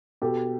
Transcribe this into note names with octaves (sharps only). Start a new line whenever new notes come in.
B2 G4 A4